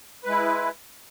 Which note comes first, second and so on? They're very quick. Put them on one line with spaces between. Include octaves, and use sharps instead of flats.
B4 G#3 E4